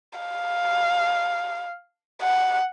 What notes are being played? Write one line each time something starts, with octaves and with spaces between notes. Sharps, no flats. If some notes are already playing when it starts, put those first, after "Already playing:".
F5
F#5